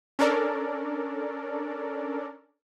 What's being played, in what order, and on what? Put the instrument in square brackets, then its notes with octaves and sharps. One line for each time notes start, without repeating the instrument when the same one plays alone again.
[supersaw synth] C#4 D4 A4 A#4 D5